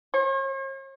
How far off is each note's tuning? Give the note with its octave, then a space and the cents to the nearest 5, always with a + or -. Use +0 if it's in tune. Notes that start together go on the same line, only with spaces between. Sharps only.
C#5 -45